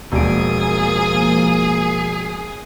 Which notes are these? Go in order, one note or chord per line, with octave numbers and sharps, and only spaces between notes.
E1 F3 A#3 G#4 D7